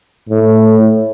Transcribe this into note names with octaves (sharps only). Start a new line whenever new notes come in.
A2